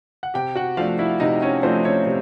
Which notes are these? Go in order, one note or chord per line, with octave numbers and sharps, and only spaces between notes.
F#5
C3 G4 G5
F#4 F#5
F3 A3 D4 F4 F5
E4 E5
C3 D#4 D#5
C#4 C#5
F3 A3 C4 D4 C5
C#4 C#5
C3